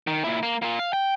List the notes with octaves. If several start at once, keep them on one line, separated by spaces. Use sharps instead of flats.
D#3
A#2 E4
A#3
A#3 F4
F5
G5